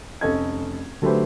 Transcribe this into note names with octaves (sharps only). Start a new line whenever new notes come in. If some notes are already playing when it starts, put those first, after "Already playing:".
F1 C#4 A4 D#5 G#6
D3 F#3 A3 G4 B4 C5